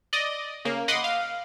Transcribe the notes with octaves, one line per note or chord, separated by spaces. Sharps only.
D5 D#5
C#3 A#3
D#5 F#5 B5 C6 D6 D#6
F5